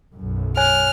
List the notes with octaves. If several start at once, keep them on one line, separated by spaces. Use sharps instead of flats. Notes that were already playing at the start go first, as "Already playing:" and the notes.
B1 F#2
C#5 G#5 F6 F#6